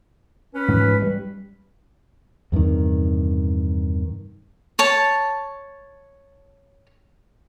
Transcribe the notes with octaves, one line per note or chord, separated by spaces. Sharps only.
C#4 B4
G#2 E3 F3
G3
E2 G2 C3 D#3
C#5 A5